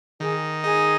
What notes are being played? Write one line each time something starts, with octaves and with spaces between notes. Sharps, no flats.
D#3 G#4
D#4 G#4